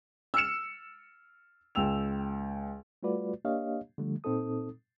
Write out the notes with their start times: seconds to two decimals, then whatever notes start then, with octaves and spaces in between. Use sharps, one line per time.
0.34 E6 F6 C#7 E7
1.75 C#2 G5 E6 F7
3.03 G3 A3 F4 F#4 B4 D5
3.45 A#3 D4 G4 C#5 D#5 F5
3.98 D3 F3 G3 A3
4.24 A#2 C4 D#4 A4 D#6